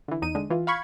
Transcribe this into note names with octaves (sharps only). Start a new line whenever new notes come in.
D3 E3
E2 D#4 D#7
D3 G#3
E3 F4
F5 B5 C#6 G#6